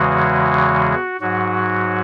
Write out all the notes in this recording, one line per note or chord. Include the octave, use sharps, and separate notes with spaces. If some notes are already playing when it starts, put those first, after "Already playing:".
Already playing: E2 C#3 E3 G#3 F#4
G#2 F#3 F#4